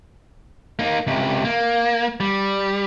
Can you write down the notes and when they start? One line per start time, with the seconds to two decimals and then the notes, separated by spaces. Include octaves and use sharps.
0.79 A#3 D#4
1.07 C#2 C3
1.45 A#3
2.20 G3